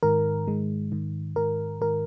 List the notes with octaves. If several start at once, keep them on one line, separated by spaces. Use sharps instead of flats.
G#2 D#3 A#4
G#2 D#3 G#3
G#2 D#3
G#2 D#3 A#4
G#2 D#3 A#4